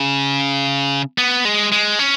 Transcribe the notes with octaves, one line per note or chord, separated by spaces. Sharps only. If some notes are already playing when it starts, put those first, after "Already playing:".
Already playing: C#3
B3
G#3
G#3
C#4